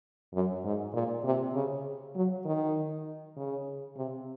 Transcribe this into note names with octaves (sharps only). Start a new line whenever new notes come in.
F#2
G#2
A#2
C3
C#3
F#3
D#3
C#3
C3